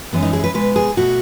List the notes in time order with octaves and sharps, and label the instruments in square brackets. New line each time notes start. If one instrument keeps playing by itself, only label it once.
[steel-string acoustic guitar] F#2 E3 G#3 B3
D#4
G#4
B4
B2 G#3 B3 B4
G#4
B2 A3 F#4